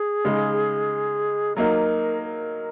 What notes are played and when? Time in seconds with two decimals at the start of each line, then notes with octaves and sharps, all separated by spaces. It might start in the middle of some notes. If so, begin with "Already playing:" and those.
Already playing: G#4
0.25 C#3 G#3 D#4
1.57 F#3 A#3 D#4 A#4
2.23 A#4